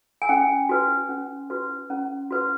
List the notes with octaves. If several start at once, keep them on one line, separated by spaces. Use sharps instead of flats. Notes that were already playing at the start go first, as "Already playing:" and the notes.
G#5
C#4 G5
F#4 B4
C#4
F#4 B4
C#4
F#4 B4